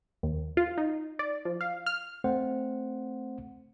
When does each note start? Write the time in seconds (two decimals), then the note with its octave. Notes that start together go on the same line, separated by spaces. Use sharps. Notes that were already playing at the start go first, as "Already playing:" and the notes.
0.23 D#2
0.57 F4
0.78 D#4
1.19 D5
1.45 F3
1.61 F5
1.86 F6
2.24 A3 C4 C5 F#5